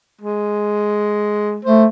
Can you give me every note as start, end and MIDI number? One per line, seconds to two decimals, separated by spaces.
0.21 1.60 56
1.65 1.86 57
1.65 1.85 72